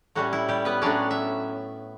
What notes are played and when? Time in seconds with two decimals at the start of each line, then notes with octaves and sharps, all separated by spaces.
0.15 A2 G3 C#4 F#4
0.33 E4
0.48 G3 G4
0.65 B3 B4
0.82 A2 F#3 C#4 D4 D5
1.11 E5